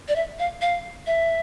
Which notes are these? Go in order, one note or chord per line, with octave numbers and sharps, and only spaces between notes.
D5
E5
F5
F5
E5